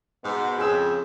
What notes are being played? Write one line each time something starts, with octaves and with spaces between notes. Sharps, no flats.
G#2 B2 B3
F2 C#3 G#4 E6